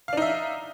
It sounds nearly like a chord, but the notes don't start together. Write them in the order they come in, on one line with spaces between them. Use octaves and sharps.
F5 D4 D#4 E5